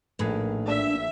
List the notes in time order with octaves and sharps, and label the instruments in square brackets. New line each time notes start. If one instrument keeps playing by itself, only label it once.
[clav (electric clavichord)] A#1 G#4 B4 [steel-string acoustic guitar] A2 D#3
[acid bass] D4 [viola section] E5